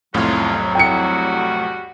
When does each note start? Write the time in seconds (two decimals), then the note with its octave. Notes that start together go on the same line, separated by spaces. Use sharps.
0.14 C2 F2 A2 F#3 G#3 C#4 F4
0.75 G3 F#4 G5 C#7